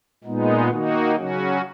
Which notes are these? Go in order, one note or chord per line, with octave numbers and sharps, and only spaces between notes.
A#2 G#3 B3 D#4
D#3 A#3 D#4 F#4
C#3 F#3 C#4 F#4